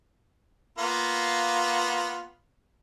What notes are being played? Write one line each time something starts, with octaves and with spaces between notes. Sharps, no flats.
A#3 B3 F4